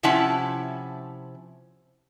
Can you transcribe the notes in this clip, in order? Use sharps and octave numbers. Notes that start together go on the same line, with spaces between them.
C3 F3 C#4 E4 F#5 A5